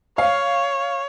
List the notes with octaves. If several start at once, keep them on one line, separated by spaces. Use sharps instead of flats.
C#5 F5